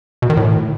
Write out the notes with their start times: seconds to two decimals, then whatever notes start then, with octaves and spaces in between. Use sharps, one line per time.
0.22 B2
0.30 D#3
0.37 A2